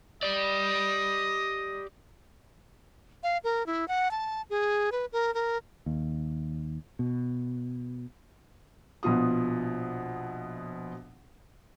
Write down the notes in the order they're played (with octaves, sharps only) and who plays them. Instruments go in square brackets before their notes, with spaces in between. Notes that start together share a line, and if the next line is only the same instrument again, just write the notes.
[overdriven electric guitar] G4 D5 [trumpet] D#5
[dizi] F5
A#4
E4
F#5
A5
G#4
B4
A#4
A#4
[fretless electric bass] D#2
B2
[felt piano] A#1 B2 B3 F4 D#6